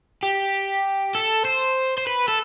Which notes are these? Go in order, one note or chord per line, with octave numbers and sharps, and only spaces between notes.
G4
A4
C5
C5
B4
A4